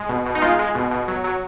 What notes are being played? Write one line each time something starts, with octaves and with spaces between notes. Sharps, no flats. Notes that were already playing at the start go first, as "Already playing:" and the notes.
Already playing: G#3
B2
B2
D#4
G#3 F4
G#3
B2
B2
F#3
F#3